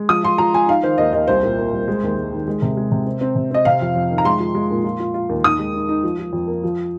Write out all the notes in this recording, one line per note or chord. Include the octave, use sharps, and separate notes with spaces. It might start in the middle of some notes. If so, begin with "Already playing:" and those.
Already playing: G#3
F3 D#6
F4 C6
F3 A#5
F3 G#5
D#4 F5
D#3 C5
D#2 D#5
D#2 D#5
C2 C5
A#2
A#3
C2
G#3
D#2
G#3
D#3
G#3
C3
G#3
C3
C4
C4
C3
C4 D#5
C3 F5
F2
F2
D#3
A#5
G#3 C6
F3
G#3
A#2
F4
F4
F4
D#2
D#4 D#6
G#3
D#4
D#4
F3
F3
F2
A#3
F3